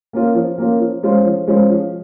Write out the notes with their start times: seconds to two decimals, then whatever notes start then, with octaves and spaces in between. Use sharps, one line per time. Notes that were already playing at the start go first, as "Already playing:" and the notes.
0.13 A#3 C#4 F4
0.35 F3
0.58 A#3 C#4 F4
0.80 F3
1.03 G#3 C#4 F4 C5
1.25 F3
1.47 G#3 C#4 F4 C5
1.70 F3